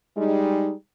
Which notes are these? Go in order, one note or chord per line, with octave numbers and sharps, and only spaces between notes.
G3 G#3 D#4